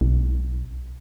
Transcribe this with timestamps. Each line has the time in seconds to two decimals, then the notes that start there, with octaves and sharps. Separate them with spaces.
0.01 B1